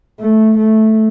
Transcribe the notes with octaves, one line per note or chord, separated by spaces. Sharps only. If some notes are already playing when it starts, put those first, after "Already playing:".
A3
A3